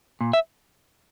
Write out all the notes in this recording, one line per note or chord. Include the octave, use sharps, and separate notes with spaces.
A#2
E5